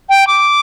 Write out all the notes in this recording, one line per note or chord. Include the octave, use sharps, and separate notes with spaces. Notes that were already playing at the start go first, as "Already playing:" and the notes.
G5
D6